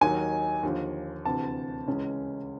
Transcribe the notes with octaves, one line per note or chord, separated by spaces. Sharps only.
D#2 D#3 F#3 G#5
D#2 D3 F3
D2 C3 E3 A5
C#2 C#3 E3 G#3 C#4